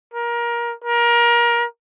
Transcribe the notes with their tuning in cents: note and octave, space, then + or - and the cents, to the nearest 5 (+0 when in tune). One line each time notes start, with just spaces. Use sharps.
A#4 +25
A#4 +25